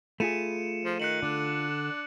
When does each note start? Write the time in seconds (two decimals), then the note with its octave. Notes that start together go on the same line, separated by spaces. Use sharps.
0.20 A3 F4 G#4 B5 C#7 D#7 E7
0.85 F3
1.00 D#3 F#6 C#7 F#7
1.22 D3 D4